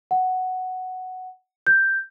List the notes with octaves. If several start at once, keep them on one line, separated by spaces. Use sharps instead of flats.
F#5
G6